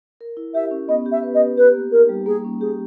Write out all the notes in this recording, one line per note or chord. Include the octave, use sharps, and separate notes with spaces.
A#4
E4
G4 E5
C#4
B3 D#5
G4
E5
B4
D#5
B3
G4 B4
A#3
D#4 A#4
G3
A#3 G#4
C#4
G4 G#4